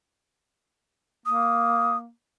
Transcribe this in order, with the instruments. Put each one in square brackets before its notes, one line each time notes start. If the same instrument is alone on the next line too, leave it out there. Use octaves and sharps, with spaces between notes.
[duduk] A#3 [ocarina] D#6